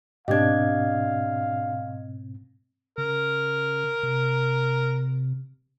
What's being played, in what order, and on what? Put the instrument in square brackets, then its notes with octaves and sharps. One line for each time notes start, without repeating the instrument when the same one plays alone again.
[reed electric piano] G#2 B2 C4 [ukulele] D4 G4 [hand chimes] D#5 G#6 [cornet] F5
[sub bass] C#3 [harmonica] A#4
[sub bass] C3